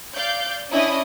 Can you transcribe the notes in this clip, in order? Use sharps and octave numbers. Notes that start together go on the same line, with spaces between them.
D5 F5 G6
C#4 D4 E4 D#5 D#6